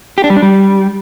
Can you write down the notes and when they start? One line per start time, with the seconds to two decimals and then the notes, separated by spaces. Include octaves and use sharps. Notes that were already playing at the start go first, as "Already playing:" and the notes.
0.18 G4
0.24 D4
0.30 G3
0.36 D4
0.42 G3